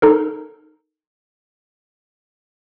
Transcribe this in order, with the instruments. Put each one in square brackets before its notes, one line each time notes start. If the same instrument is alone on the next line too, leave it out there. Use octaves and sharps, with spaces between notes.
[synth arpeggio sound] D#4 A4 A#4